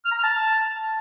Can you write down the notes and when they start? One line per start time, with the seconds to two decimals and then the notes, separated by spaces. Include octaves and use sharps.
0.05 F6
0.11 A#5
0.18 F6
0.24 A5